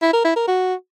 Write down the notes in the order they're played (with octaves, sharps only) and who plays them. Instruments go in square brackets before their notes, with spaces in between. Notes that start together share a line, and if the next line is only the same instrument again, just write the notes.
[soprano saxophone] E4
A#4
E4
A#4
F#4